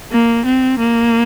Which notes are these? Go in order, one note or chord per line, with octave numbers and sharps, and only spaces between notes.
A#3
C4
A#3